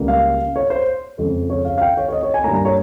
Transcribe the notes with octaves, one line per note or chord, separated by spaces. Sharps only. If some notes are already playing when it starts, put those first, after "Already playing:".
Already playing: C#2 C#3 G3 A#3
F5
C#5
C5
F2 C#3 G#3
C#5
F5
F5
G5
C#5
C#5
D#5
C#5
G#5
G2 G3 A#3 A#5
A#5
C#5